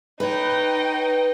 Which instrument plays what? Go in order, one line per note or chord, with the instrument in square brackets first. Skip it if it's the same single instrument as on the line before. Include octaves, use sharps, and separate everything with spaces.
[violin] D#4 G5 [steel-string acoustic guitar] B4 C#5